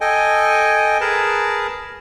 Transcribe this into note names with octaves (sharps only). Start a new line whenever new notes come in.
A4 D#5 G5 G#5
G#4 A#4 B4 A5